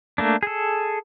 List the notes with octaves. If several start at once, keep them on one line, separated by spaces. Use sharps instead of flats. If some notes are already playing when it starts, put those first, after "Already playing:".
A3 A#3 D4
G#4 A4